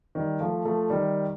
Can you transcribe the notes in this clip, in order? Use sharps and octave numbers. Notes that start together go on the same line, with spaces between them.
D#3 G3
F3 A3
F3 A3
D#3 G3